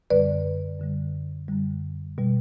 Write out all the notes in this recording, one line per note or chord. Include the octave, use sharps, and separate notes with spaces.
F#2 D3 G3 B4 D5
F#2 D3 G3
F#2 D3 G3
B2 G3